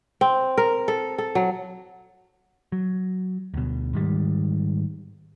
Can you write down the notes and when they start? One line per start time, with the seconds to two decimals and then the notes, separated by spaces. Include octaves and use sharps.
0.21 C4
0.58 A#4
0.88 A4
1.18 A4
1.35 F#3
2.72 F#3
3.54 D2 B2
3.93 G#2 D#3 G3